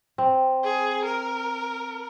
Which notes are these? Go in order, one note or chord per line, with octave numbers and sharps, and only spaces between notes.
C4
G#4
A#4